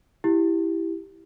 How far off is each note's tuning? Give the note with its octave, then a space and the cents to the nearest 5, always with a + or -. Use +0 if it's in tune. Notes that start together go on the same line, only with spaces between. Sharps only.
E4 +0 G4 +0